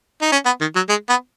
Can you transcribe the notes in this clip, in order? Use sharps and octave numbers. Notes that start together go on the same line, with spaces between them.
D#4
C#4
B3
D#3
F#3
G#3
B3